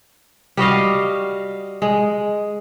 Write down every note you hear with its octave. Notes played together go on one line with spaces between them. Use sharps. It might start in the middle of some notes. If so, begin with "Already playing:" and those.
G3 F#4 D#5 F5
G#3